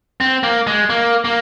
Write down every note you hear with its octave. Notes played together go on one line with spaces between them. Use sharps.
C4
A#3
G#3
A#3
A#3